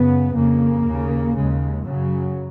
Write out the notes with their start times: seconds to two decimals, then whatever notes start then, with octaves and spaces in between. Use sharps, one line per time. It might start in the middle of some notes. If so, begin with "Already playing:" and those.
Already playing: F#2 C#3 B3
0.35 F2 C#3 A#3
0.85 D#2 C#3
1.36 D#2 C#3 G#3
1.86 F#2 C#3 F#3